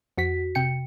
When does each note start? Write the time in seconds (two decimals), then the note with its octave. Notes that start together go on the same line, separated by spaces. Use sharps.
0.18 F2 F#4 B6
0.55 C3 G5 C#7